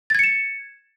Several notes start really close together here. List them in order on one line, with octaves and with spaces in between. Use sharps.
A6 G#6 C#7 E7